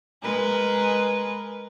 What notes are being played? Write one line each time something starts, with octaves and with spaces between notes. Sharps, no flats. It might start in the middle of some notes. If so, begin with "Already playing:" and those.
G#3 A#4 B4